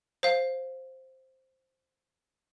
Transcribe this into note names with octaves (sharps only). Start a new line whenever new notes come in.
C5 F5